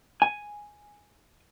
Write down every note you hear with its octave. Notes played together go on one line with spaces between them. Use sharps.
G#5